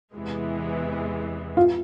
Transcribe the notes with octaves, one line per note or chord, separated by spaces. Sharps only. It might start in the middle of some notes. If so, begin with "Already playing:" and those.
E2 C3 E3 G#3 B3
F4